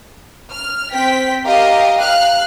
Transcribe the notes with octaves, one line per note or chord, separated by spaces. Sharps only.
F6
C4 G5 B6
G4 A#4 D#5 F5
F5 F6 F#6